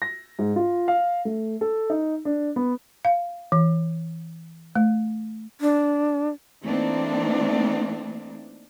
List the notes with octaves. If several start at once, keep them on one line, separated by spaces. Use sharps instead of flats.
A#6
G#2
F4
F5
A3
A4
D#4
D4
B3
F5
E3
A3
D4
E3 A3 A#3 C4 D4 D#4